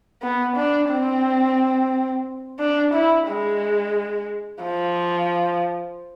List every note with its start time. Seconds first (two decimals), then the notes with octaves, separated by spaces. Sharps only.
0.23 B3
0.57 D4
0.90 C4
2.60 D4
2.94 E4
3.29 G#3
4.64 F3